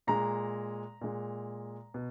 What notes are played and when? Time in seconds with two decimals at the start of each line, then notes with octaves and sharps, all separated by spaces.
0.07 A#2 G#3 A#5
1.01 A#2 G#3
1.94 B2